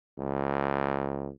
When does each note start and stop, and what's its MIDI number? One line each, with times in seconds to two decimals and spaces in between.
0.19 1.31 37